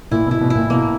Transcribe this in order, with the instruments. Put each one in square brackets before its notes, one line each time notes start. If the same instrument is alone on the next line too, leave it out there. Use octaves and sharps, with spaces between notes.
[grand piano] A#2 [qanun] E4
[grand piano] B2
[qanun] E4
[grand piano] B2
[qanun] E4
[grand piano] A#2
[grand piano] B2 [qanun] A#3